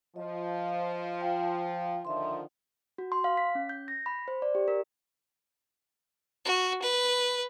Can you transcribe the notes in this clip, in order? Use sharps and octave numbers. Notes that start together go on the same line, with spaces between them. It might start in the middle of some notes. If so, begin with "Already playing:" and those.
F3 D#5
F4 F5 G5
D3 D#3 F3 E5 C6
F#4
C6
F5
B6
C#4
G6
A#6
B5
C5
D5
G4
A#4
F#4
B4